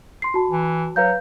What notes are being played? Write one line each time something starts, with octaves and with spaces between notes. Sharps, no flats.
C6 C7
F#4 A5
E3
F#3 B4 F5 G6